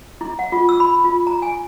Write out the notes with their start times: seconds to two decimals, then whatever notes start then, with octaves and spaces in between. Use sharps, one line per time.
0.21 E4
0.39 F#5
0.52 F4
0.69 E6
0.80 B5
1.04 F4
1.27 A#5
1.42 G#5